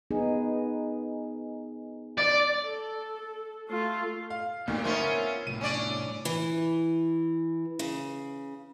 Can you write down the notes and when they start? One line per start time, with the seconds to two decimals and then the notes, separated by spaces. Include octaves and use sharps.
0.11 B3 D#4 G#4
2.18 D5
2.64 A4
3.70 A3 F4
4.30 F5
4.68 D2 A#2 D3 G3 D#4
4.84 B3 C#4 F4 A#4 C5 E5
5.47 C2 A2 D#7
5.61 C#4 D4 D5
6.25 E3
7.79 C#3